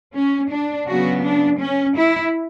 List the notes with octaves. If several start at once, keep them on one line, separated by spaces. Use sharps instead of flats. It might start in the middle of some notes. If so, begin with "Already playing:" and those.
C#4
D4
C#3 F#3 B3 F#4
D4
C#4
E4